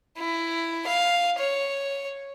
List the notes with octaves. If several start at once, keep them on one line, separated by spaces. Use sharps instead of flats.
E4
F5
C#5